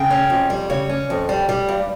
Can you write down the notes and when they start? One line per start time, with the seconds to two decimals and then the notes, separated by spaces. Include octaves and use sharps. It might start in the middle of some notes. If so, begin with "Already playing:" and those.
Already playing: C#3 G5
0.10 C#4
0.30 F2
0.50 G3
0.70 C#3 C#5
0.89 C#4
1.10 F2
1.29 G3
1.49 G3
1.69 G2